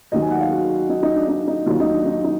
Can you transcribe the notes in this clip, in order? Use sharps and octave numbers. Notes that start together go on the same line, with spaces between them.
D#2 D#3 F#3 D#5
G#5
F#5
F5
F#4
D#4
D#4
D4
D#4
D#4
D#2 D#3 F#3 F4
D#4
D4
D#4
D#4